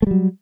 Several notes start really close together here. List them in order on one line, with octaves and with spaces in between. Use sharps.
A3 G3 F#3